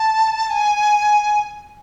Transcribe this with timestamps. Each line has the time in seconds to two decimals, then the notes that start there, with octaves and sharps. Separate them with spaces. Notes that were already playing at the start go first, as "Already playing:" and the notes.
Already playing: A5
0.50 G#5